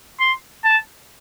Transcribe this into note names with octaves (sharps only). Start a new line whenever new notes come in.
C6
A5